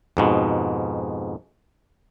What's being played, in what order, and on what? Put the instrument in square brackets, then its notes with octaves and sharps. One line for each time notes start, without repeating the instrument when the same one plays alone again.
[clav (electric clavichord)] F2 G#2 B2